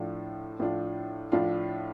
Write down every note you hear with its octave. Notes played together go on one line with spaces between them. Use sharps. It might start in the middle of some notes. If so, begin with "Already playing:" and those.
Already playing: A2 F3 D4 F4
A2 F3 D4 F4
A2 F3 D4 F4